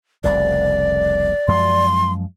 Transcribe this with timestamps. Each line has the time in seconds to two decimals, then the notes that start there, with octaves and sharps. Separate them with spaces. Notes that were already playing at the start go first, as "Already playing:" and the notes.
0.24 F1 C2 C#3 D5
1.48 F#2 F3 G#3 C6